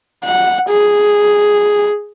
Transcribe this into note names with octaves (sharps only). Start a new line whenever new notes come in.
F#5
G#4